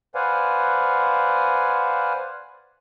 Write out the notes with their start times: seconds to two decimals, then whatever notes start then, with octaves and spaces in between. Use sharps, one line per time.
0.15 B4 C5 D5 F5 F#5 G#5